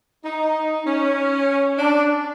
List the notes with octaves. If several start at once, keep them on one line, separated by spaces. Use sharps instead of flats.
D#4
C#4
D4